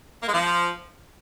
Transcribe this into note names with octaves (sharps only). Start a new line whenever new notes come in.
A#3
G#3
F3